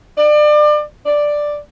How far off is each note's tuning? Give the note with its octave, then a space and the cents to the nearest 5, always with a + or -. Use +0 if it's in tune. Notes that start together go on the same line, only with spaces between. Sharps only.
D5 +30
D5 +5